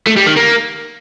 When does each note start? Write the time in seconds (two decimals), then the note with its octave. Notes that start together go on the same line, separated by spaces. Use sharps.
0.07 A3
0.17 G3
0.27 D#3
0.37 A#3